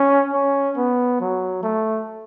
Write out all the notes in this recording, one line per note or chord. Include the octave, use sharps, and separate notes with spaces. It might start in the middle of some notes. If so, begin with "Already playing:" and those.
Already playing: C#4
C#4
B3
F#3
A3